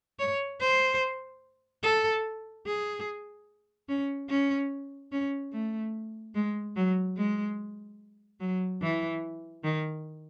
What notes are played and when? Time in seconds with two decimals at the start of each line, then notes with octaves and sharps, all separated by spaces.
0.19 C#5
0.60 C5
1.83 A4
2.66 G#4
3.89 C#4
4.29 C#4
5.12 C#4
5.53 A3
6.35 G#3
6.76 F#3
7.17 G#3
8.40 F#3
8.82 E3
9.64 D#3